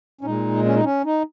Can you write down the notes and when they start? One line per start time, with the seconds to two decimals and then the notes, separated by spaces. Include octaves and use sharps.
0.21 C#4
0.24 A#2 G#3 D#4
0.65 C#4
0.75 D#4
0.83 C#4
1.05 D#4